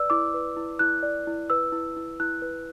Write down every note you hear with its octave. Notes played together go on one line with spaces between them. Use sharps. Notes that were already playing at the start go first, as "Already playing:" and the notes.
Already playing: B4 D5 E6
E4 D6
B4
E4
E4 F#6
D5
E4
B4 E6
E4
E4
E4 F#6
B4